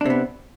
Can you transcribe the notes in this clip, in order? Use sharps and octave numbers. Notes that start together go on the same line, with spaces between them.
C3 B3 D4